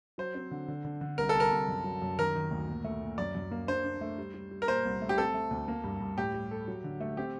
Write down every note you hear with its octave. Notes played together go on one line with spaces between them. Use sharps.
F#3 C5
C4
D3
D3
D3
D3
C2 A#4
A4
C2 A#4
C2
F#2
F#3
F#2
D#3 A#4
D#3
D2
A#2
A3
A#2
F#2 D5
F#2
A#3
D4 C5
D4
A3
G3
G3
G3
A#4
A#2 C5
C2
A3
G4
C4 A4
A3
D2
A#3
G2
G2
A2 G4
G3
A4
F#3
D3
A3
C4 G4